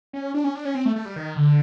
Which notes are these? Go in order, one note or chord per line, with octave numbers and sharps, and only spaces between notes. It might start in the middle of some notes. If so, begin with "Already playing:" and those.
C#4
D4
C#4
D4
C#4
C4
A3
A3
G3
D#3
D3